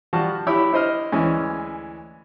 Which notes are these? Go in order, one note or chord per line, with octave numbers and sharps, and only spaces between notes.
F3 G3 F#4 A5
E4 G4 C#5 B5 E6
E4 C5 D#5 F6
D2 E3 G#3 C#4